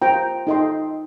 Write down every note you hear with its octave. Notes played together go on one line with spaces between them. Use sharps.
F4 C5 G5 A#5
D#4 A4 D#5 G5 C6